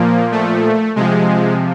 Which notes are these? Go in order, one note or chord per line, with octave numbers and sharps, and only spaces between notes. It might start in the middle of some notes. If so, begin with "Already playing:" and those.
Already playing: A#2 F3 A#3
A3
C3 F3 G#3